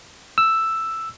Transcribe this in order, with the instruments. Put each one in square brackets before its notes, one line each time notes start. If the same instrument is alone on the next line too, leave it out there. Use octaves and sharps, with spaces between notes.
[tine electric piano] E6